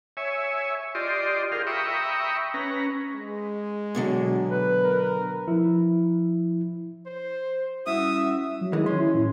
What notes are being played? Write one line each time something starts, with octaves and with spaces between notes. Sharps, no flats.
C#5 E5 G#5
F4 G4 D5 D#5 C6
F4 G4 G#4 A#4 F5
E5 G5 A#5 B5 C#6 D#6
C#4 B4 A#5
G#3
B2 D3 F#3
B4
A#4
F3 E4
C5
G3 C#4 E4 F#4 E5 D#6
F#3
D#3 E3 G#3
C#4 C6
E4
A2